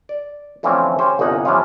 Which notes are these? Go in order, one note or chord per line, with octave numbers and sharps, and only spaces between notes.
D5
D3 E3 F3 A3 C4 C#4
C#4 G4 C5
G1 C2 A#3 D#4 F#5 G#5
E3 F3 B3 C#4 F4